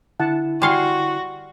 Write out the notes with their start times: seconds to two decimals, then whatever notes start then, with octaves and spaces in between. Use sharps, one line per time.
0.20 D3 E4 F#5 A5
0.62 G3 F#4 F5 G#5 C6 C#6